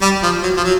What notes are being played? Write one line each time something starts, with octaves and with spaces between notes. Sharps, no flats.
G3
F3
F#3
F3
F#3